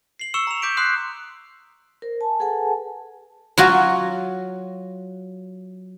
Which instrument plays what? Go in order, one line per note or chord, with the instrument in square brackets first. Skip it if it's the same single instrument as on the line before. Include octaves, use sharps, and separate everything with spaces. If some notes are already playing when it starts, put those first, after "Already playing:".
[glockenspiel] C7 F#7
C#6 E6 C#7 E7 F#7
A#5 F7
D6 G6 B6 D7
C6 D#6 F#6 C7
[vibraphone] A#4 C5
G#5 A5
G#4 A4 B4 F#5 G#5 A5
[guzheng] F#3 F4 F#4